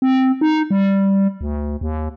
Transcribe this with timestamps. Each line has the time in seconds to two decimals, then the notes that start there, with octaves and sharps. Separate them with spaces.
0.02 C4
0.41 D#4
0.71 G3
1.41 D2
1.81 D#2